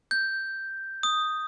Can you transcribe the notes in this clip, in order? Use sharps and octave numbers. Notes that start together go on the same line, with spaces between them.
G6
D#6